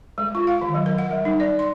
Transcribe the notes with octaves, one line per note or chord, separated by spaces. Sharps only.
G#3
F4
F5
D#3
F#3
A#4
F#5
G3
D#4
D5
C6